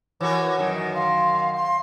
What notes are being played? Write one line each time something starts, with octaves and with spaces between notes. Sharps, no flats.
E3 F#4 A#4 C#5
F#2 D#3
F5 C6
F5 C6